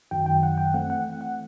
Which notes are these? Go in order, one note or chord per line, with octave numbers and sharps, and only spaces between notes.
F#2 D#3 F#3 G5
G5
F#5
G5
E3 A3 C4 F#5
F#5
F#5